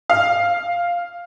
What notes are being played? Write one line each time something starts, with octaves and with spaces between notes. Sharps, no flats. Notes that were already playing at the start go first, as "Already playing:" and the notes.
F5